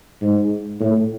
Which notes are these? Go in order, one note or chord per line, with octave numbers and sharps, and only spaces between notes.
G#2
A2